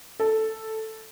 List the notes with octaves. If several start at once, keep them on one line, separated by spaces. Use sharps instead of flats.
A4